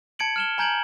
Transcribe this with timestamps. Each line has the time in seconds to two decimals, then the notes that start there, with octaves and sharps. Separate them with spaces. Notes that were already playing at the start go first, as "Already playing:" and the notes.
0.19 A5 G#6 C#7 D7 F#7
0.36 F6 E7 G7
0.58 G#5 A#5 G6 G#6 D7 F#7